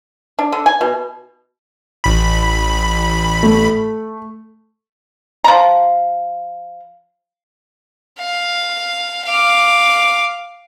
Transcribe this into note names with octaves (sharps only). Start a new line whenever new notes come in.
D4
D3
G#5
B2
A1 B5
A3
F3 A#5
F5
F5 D6